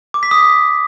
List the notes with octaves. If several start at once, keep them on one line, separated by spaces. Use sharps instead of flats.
D6
B6
D#6